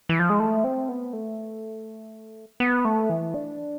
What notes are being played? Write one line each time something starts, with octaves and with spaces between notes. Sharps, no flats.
E3
F3
G#3
A3
C4
B3
A3
B3
A3
E3
D4